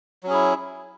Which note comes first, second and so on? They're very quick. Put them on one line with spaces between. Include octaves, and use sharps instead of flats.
F#3 C#4 G#4 E4